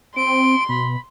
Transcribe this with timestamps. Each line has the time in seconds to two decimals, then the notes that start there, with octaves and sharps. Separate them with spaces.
0.16 C4 C6 D7
0.69 B2 B5